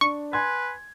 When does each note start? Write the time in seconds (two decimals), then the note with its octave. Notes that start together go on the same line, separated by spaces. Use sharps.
0.01 D4 C#6
0.33 B4 G#5 C6 G#6